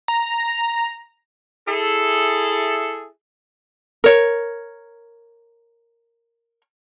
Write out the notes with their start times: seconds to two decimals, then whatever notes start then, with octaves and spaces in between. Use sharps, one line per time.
0.08 A#5
1.68 E4 G#4 A4
4.04 A#4 C#5